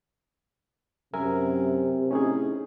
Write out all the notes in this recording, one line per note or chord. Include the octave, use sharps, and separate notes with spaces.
F#2 C3 A#4 E5 G#5
A2 C#4 D#4 G#4